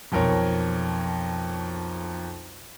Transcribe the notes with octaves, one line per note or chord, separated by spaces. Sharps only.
B1 F2 A#4 C#5